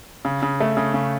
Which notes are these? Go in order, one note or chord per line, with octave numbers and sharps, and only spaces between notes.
C#3
C#3
A3
C#3
C#3